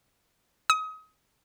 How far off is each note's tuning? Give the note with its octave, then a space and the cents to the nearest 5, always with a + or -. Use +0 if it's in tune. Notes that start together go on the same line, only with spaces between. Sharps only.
D#6 +30